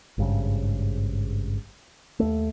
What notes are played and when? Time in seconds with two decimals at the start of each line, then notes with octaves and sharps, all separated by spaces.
0.18 G#1 G2 C#3
2.19 D#2 A3